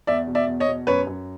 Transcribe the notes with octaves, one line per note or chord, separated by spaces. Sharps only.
E2 D5 E5
B2
D5 E5
E2
C#5 D#5
B2
F#2 B4 C#5
F#2